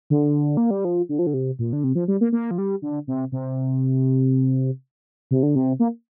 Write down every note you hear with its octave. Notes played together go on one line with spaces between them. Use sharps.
D3
A#3
G3
F3
D3
F3
D3
C3
A#2
D3
C3
F3
G3
A#3
A#3
F3
G3
D3
C3
C3
C3
D3
C3
A#3